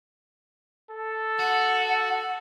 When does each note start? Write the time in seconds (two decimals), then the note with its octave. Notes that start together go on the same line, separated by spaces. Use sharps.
0.90 A4
1.39 F#4 F#5